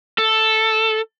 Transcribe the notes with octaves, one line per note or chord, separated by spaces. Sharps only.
A4